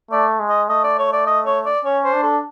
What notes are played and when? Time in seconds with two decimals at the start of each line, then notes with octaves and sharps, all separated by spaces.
0.11 A3 D5
0.40 G#3
0.49 D#5
0.69 A3 D#5
0.84 D5
0.98 C#5
1.12 D5
1.26 D#5
1.46 C#5
1.66 D5
1.85 C#4 C#5
2.04 C5
2.13 D4
2.23 A4